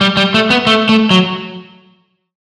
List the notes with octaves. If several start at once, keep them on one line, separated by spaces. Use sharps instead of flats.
G3
G3
A3
B3
A3
A3
F#3